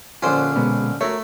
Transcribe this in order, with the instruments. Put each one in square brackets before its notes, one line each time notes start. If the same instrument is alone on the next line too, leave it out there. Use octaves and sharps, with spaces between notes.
[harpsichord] A#1 D3 C#4 [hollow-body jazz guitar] F4 C5
[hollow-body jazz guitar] B2 G#3 B3
[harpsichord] A3 [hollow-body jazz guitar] F#4 A#4 C#5